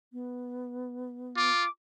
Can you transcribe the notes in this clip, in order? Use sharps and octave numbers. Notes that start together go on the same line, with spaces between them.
B3
F4 D6